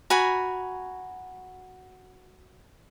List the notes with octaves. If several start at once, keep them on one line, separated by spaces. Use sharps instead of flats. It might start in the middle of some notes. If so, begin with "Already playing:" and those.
F#4 G#5 A#5 B5